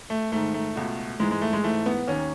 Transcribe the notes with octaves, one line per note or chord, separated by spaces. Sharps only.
A3
G#2 D#3 A3
A3
C#2 B2
G#2 E3 G#3
G#3
A3
G#3
G#2 E3 A3
B3
D#2 D#3 C#4